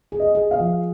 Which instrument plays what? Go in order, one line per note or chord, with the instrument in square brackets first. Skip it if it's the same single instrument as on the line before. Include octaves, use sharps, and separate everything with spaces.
[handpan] G#4
[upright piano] D#5
[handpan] G#4
[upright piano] F5
[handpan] F3